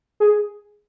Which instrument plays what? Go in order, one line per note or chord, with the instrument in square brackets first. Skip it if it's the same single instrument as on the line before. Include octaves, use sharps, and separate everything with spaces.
[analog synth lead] G#4